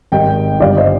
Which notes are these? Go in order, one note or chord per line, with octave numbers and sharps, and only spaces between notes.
G#1 G#2 G3 D#5 G5
G1 G2 D3 G3 D5 F5
C5 D#5